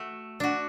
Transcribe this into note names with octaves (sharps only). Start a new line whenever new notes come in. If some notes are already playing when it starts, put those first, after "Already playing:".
Already playing: A3 F#4
D4 F#4